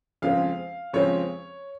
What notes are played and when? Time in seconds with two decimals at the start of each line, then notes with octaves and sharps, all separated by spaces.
0.22 F2 C#3 F3 G#3 C4 F5
0.93 F2 C#3 F3 G#3 C4 C#5